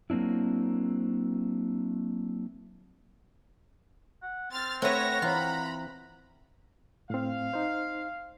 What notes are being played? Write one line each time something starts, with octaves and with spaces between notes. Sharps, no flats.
F#3 A#3 C4 D4 E4
F#5
C4 F6 A6
A3 C4 B4 C#5 E5 F#5 A#6
E3 C4 F4 A#5 B5
A2 C4 F5
D#4 C5